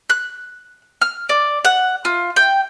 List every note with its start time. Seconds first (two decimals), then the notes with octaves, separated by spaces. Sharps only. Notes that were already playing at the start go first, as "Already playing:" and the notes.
0.10 F#6
1.01 F6
1.29 D5
1.65 F#5
2.05 F4
2.36 G5